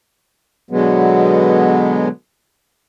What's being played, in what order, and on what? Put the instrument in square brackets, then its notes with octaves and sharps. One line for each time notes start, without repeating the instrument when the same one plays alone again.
[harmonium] B2 D3 F#3 G#3 B3